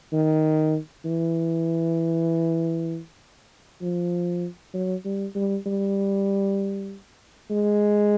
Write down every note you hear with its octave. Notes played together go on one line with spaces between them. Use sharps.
D#3
E3
F3
F#3
G3
G3
G3
G#3